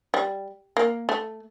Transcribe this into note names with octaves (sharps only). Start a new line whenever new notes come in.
G3
A#3
A3